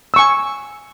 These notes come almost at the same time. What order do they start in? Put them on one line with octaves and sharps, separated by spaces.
E6 C#6 G#5